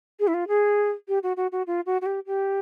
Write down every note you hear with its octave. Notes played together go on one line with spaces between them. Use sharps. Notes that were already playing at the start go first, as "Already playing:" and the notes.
G#4
E4
F4
G#4
G4
F#4
F#4
F#4
F4
F#4
F#4
G4
G4